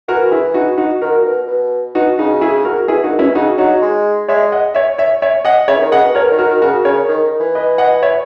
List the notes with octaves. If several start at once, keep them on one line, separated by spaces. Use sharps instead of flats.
E3 F#4 A#4
E4 G#4
D#4 F#4
D#4 F#4
D#3 F#4 A#4
A#2
B2
B2
B2 D#4 F#4
C#3 D#4 F#4
E4 G#4
F#4 A#4
B2 E4 G#4
A#2 D#4 F#4
B2 C#4 E4
C#3 D#4 F#4
F#3 D#4 F#4
G#3
G#3 C#5 E5
D#5 F#5
C#5 E5
C#5 E5
C#5 E5
D#5 F#5
C#3 C#5 E5
E3
D#3
C#3 D#5 F#5
B2
B2 A#4 C#5
D#3
F#4 A#4
D#3
C#3 F#4 A#4
C#3 A#4 C#5
D#3
D#3
E3
B4 D#5
D#5 F#5
C#5 E5